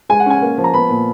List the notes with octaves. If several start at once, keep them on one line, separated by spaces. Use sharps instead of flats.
G#3 G#5
F#5
C#4 G#5
A#3
F3
A#5
B3 B5
A#2